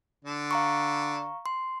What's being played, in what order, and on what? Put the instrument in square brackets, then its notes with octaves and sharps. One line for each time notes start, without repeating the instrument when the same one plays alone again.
[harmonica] D3
[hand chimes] F5 A#5 C#6
C6